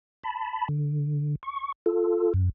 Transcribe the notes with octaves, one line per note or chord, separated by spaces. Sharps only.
A5 B5
D3
C#6
F4 A4
F#2